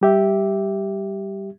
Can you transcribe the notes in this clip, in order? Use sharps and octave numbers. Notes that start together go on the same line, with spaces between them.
G3 G4 E5